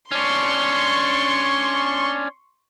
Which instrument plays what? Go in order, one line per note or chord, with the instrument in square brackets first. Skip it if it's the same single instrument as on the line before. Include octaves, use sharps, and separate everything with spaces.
[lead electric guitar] C#4 D4 [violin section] C6 C#6